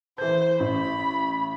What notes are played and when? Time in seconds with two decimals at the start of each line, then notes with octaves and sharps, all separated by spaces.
0.18 E3 C5 G6
0.60 A1 B5